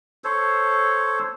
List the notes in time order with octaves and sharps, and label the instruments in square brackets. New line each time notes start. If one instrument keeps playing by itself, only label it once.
[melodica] A4 C5 C#5